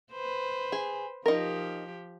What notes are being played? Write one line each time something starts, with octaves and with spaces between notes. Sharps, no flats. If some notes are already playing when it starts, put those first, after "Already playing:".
B4 C5
G#4
F3 D#4 G4 A#4